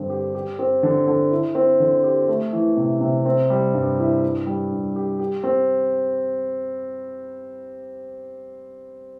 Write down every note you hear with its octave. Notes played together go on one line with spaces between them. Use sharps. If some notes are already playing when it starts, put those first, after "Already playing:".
Already playing: G2 D3 C4
G4
G4
C4
D3
D3
E4
C4
D3
G4
A3
E3
C3
C3
C4
G3
G2
E4
E4
G3
G2
G4
G4
C4